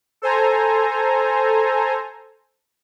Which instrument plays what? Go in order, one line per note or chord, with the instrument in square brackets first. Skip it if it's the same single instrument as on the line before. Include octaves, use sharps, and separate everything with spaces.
[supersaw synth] A4 C5 G#5 A#5